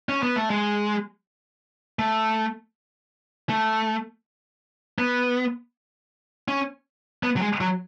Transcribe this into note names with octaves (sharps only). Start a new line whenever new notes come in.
C#4
B3
A3
G#3
A3
A3
B3
C#4
B3
F#3
G#3
F#3